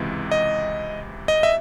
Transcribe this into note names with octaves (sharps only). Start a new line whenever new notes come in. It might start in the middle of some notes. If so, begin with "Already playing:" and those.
Already playing: C#2 C3 E3 G#3
D#5
D#5
E5